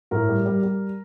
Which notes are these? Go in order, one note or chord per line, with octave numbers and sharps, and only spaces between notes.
A2 A#4
G3
G3
G3